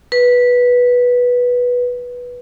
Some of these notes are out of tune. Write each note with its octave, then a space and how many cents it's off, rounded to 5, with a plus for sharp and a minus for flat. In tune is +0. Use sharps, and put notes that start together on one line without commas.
B4 -10